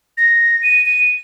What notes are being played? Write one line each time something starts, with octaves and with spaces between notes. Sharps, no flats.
A#6
D#7
D#7